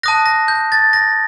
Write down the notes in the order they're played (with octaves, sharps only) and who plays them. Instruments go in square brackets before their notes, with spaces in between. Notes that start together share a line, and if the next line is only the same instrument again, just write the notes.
[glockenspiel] A5 D#6 F#6 A#6
A#6
G6
A6
A#6